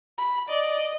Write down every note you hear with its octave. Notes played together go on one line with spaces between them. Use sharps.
B5
D5 D#5